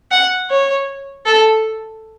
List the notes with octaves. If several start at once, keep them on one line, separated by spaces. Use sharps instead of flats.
F#5
C#5
A4